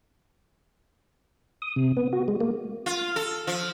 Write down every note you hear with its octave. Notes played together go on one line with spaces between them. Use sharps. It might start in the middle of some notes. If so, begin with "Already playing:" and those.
D#6
C3
B3
F#4
G#3
A#3
F4
A4
F3